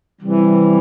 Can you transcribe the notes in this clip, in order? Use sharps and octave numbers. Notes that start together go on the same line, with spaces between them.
C3 E3 G3